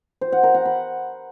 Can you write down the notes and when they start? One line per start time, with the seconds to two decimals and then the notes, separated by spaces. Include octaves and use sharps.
0.21 C5
0.32 F#5
0.43 A#4
0.54 F#5
0.65 B5